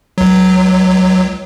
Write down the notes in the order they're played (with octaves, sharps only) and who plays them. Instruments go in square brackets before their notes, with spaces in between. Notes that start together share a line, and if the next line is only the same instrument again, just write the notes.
[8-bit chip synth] C#2 F#3